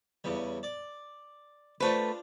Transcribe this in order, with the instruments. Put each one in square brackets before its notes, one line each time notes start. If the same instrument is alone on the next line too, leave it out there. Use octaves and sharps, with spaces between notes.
[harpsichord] E2 C#3 G3
D5
[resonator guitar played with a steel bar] A3 B4 [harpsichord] D4 F4 C5